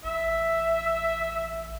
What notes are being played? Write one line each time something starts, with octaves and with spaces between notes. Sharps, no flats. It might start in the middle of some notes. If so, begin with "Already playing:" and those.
A1 E5